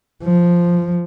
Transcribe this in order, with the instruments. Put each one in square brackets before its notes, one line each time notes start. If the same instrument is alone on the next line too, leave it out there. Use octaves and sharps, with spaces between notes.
[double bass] F3